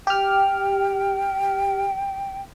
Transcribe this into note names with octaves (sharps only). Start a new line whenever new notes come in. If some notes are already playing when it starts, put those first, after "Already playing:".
G4 G5 F6